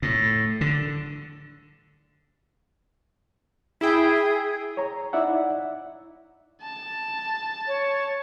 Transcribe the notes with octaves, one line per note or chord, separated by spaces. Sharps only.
A2
D3
E4 G#4 G5
C#5 A#5
D#4 E4 D5 E5 F#5
A5
C#5